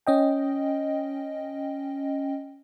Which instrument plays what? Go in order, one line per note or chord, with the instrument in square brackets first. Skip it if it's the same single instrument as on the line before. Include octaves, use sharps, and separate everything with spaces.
[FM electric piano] C#4 D#5 G5